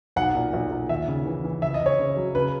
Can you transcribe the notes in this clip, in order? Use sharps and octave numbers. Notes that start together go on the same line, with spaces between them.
B1 F#5
A#2
B1
A#2
D#2 E5
C#3
E3
E3
C#2 E5
D#5
C#2
C#5
C#3
F#3
C#3 B4